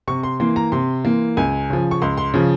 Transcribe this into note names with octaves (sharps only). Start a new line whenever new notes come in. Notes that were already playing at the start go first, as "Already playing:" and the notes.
C3 C#6
C6
E3 A#3 C6
A#5
C3 C6
E3 A#3
C#2 G#5
C#3 F3
C#6
C#2 C6
C6
C#3 F3